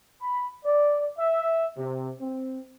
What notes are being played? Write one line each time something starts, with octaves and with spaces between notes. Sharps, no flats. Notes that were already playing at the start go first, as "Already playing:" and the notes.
B5
D5
E5
C3
C4